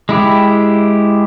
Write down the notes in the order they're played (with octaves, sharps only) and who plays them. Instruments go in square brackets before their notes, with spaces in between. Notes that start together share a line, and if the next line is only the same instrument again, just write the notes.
[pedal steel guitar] G#3 E4 G4